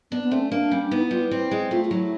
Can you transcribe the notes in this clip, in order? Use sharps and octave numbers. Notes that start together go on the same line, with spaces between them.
B3 D4
B3
A3 C4
C#4
A#3 D4
G3 C#4
D4
B3 D#4
E4
G3 F4
E4
C4
G#3
A3 F4
F4
F#3 E4